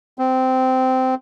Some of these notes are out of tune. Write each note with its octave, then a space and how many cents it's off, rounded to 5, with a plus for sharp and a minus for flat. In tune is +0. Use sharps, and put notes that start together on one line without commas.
C4 -15